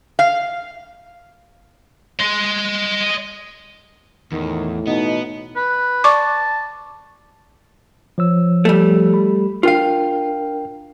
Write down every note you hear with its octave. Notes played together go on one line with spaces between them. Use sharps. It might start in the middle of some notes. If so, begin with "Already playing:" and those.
F5
D#5 C6
E2 A2 D#3
B2 B3 D#4
B4
D5 A5 C#6 D6
F3 C#5 E6
G3 A3
B5
D4 F4 A#4 F5 G5